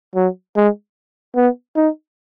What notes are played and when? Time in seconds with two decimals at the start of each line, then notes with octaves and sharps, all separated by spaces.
0.15 F#3
0.56 G#3
1.36 B3
1.76 D#4